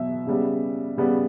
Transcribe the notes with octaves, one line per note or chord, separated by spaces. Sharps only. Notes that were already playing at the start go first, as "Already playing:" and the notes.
Already playing: B2 F#3 B3 E5
C#3 G3 B3
C#3 G3 B3